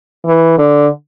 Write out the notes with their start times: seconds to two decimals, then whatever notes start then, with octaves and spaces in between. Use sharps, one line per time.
0.26 E3
0.58 D3